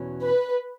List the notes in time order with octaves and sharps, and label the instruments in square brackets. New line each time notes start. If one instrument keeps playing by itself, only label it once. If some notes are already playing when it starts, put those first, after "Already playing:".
Already playing: [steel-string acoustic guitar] E2 B2 F#3 C#4
[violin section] B4